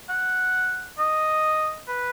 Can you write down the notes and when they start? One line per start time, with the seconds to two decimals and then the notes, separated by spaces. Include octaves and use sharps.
0.09 F#5
0.98 D#5
1.88 B4